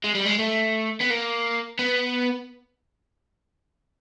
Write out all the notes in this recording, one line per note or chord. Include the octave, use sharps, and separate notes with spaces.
G#3
G3
G#3
A3
B3
A#3
B3